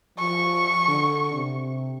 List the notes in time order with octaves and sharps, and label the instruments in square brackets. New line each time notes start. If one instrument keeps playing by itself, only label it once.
[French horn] F3 [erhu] C#6
[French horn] D3
C3